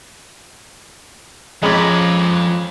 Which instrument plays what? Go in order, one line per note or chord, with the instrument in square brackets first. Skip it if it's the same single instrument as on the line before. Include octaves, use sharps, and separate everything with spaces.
[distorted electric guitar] F2 [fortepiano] G#3 C#4 [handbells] A#5 B5 D6